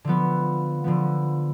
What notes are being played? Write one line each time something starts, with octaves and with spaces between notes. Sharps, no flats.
D3 F3 B3
D3 F3 B3